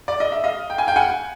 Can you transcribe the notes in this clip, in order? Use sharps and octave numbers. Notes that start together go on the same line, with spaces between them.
D5
D#5
E5
D#5 F5
G5
G#5
F5 G5
F#5 G#5